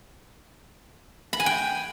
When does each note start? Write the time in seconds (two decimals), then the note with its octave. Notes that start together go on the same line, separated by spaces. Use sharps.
1.33 B5
1.40 G#5
1.46 G5